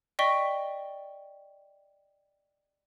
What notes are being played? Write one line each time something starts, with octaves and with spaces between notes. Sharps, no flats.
D5 D#5 G5 C#6 B6 G7